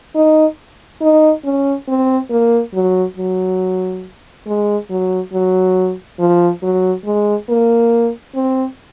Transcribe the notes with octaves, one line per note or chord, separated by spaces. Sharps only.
D#4
D#4
C#4
C4
A#3
F#3
F#3
G#3
F#3
F#3
F3
F#3
G#3
A#3
C4